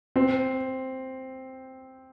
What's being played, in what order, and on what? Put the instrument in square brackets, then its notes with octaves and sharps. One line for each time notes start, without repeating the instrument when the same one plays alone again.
[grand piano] C4